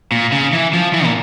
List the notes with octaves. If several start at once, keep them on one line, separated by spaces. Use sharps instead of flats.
A#2
C#3
E3
F3
E3
A#2